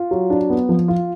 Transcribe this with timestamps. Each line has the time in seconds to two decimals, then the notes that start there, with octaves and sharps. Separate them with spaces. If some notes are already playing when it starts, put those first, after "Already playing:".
Already playing: F4
0.11 F#3
0.30 D4
0.50 B3
0.69 F3
0.88 F4